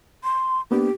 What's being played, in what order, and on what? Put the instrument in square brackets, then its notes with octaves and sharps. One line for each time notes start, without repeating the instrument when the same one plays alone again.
[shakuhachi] C6
[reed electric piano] A#3 B3 D4 [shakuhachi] G4